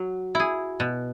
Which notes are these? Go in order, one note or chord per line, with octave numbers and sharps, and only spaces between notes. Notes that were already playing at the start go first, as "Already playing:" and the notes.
Already playing: F#3 F#4
E4 G#4
B2